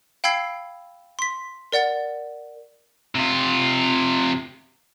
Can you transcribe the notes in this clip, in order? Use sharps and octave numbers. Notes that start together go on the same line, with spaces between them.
F5 G5 B5 E6 G#6 C7
C6 B6
A#4 D5 F#5 A6
C3 F4